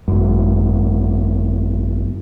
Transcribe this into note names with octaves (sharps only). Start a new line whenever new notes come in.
G#1 F#2